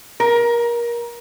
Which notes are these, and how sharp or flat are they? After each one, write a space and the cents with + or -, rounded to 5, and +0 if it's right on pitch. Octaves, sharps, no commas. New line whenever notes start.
A#4 +25